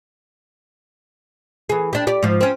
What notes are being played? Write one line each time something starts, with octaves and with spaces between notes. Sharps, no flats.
E3 G#4
D4 G4
G4 D5
G#2 F3
C4 C#4